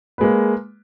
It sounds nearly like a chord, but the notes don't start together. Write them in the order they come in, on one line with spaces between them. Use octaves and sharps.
B4 G#3 A#3